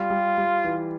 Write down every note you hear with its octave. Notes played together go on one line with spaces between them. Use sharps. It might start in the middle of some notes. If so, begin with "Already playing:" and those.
Already playing: G3 F4
G3
G3
E3